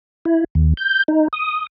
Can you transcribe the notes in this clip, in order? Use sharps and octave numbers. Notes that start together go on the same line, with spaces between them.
E4
D#2
G6
D#4
D#6